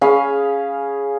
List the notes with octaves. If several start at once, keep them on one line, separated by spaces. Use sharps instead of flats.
C#4 G#4 F5 B5